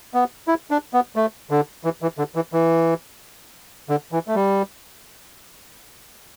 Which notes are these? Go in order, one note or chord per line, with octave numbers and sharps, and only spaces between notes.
B3
E4
D4
B3
A3
D3
E3
E3
D3
E3
E3
D3
E3
A3
G3